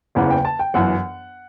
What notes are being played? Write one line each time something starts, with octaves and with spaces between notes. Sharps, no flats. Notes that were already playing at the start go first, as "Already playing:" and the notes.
F#1 E2 C#3 E3 F#5
G5
A5
G5
G1 F#2 E3 F#5